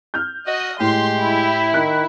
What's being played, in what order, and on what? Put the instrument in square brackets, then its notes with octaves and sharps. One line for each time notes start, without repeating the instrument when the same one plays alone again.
[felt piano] F6 G6
[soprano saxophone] F#4 [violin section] D#5
[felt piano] A2 [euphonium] G#3 [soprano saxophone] G4 [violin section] C6
[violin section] E4
[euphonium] D#3 [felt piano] F#6